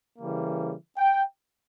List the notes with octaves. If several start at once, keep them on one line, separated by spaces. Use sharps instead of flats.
C#3 E3 G3 A#3
G5